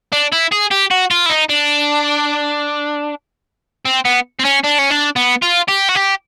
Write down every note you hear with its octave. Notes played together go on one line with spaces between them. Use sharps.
D4
E4
G#4
G4
F#4
F4
E4
D#4
D4
C4
B3
C4
C#4
D4
C#4
D4
B3
F4
G4
F#4
G4